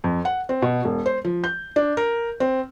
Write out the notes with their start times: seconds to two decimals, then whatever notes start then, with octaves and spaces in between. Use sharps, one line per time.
0.04 F2
0.25 F#5
0.49 C4
0.62 B2
0.85 E1
1.06 C5
1.25 F3
1.44 G6
1.76 D4
1.97 A#4
2.40 C4